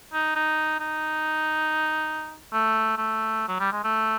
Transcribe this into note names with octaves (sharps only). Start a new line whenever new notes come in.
D#4
D#4
D#4
A3
A3
F#3
G3
G#3
A3